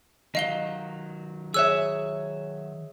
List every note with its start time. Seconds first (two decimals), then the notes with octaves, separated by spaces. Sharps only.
0.35 D#3 F#3 D#5 F5 G7
1.54 G#4 C#5 E5 E6 F#6